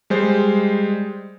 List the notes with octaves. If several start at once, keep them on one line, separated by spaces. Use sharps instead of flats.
G3 G#3 C5